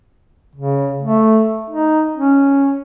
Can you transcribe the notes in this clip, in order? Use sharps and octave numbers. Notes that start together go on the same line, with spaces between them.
C#3
A3
D#4
C#4